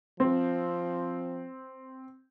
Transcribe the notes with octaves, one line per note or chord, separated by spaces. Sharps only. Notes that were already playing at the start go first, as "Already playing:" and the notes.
F3 C4